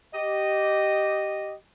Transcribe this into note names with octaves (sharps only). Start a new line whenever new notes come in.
G4 D#5